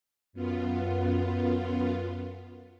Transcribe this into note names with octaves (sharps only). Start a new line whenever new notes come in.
F#2 B3 F4